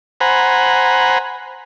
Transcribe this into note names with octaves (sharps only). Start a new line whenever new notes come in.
C5 F#5 G#5 A#5 B5